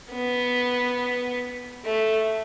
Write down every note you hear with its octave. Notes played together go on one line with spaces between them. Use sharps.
B3
A3